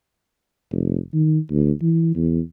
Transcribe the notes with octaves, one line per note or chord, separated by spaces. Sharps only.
F1
D#3
D2
E3
E2